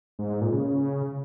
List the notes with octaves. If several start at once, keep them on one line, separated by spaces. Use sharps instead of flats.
G#2
G#2
A#2
C#3